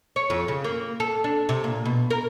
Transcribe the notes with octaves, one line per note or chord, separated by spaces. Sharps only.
C#5
F2
C#3
A#3
A4
D4
C3
A#2
B2
A#4